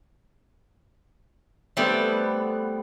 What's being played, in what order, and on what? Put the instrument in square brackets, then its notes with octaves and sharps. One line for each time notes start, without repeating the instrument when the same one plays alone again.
[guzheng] G3 A3 B3 C4 G4